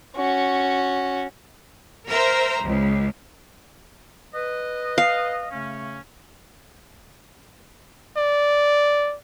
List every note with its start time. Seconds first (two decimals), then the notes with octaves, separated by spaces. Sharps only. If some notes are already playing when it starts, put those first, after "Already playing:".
0.16 C#4 F#4
2.07 A#4 C5 E5 A#5
2.64 C#2
4.34 B4 D#5
4.98 F5
5.52 C#3 A3 C#4
8.17 D5